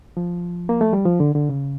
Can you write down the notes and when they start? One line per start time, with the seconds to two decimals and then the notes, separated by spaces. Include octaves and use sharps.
0.17 F3
0.69 A#3
0.81 A3
0.93 G3
1.05 F3
1.20 D3
1.35 D3
1.49 C#3